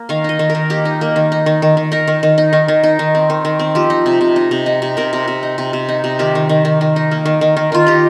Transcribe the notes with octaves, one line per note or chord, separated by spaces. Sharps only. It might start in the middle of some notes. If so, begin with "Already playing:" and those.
Already playing: A#3
D#3 F5
D#4 D#5
D#3
A#4
D#3
A#3 G4
D#4
A#3
D#3
D#4
D#3
D#3
D#3
D#4 A#4
D#3
D#3
D#4
D#3
D#3
D#4
D#3
C4
D#3
D#3
C4
F3 G4
D#4
C3
C3
D#4
C3
D#4
C3
C3 A#4
C3
C3
D#4
C3
C3
D#4
C3
D#3 G4
D#3
D#3
D#3
D#3
D#4
A#3
D#3
D#3
D#3
D#3 F4
D#4 G4